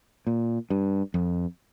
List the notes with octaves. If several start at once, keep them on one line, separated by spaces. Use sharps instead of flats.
A#2
G2
F2